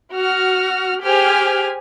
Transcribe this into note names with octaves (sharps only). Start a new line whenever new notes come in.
F#4 F6
G4 G#4 C5 G#5 F6